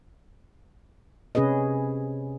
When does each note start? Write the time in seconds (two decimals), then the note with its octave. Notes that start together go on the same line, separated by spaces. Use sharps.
1.35 C3 C#4 G#4 B4 D#5